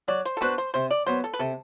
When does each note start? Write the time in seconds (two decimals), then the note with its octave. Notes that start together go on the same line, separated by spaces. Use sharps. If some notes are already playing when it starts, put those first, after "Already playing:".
0.08 F#3 D5
0.25 C5
0.37 A4
0.41 B3 D4 F#4 B4 C5
0.58 C5
0.74 C3 C5
0.91 D5
1.06 F#3 B3 C5
1.24 A4
1.34 B4
1.39 C3 A4